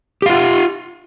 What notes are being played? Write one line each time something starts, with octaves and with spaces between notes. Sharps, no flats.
F4 G4 F5